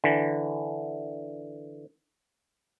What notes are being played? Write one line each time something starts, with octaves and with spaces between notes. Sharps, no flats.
D3 E3